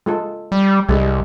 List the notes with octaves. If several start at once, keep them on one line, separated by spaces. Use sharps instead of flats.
G#3 F4 A4
G3
C2 G3 G#3